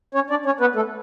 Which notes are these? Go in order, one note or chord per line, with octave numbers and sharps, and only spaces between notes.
C#4 C#5
D4 D5
C#4 C#5
B3 B4
A3 A4